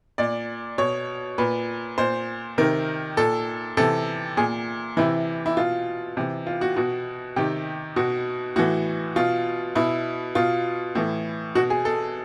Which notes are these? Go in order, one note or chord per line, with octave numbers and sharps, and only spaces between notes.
A#2 D5
B2 C#5
A#2 B4
A#2 C5
C3 D#3 A#4
A#2 A4
C3 E3 A4
A#2 G#4
C3 E3 E4
E4
B2 F4
C3 E3
F4
F#4
B2 F#4
C3 D#3 G4
B2 F#4
A2 E3 F#4
B2 F4
B2 E4
B2 F4
A2 E3
B2 F#4
G#4
A4